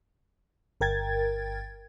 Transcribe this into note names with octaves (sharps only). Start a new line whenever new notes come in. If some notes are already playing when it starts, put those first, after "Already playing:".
G1 A#4 G5 G#6 A6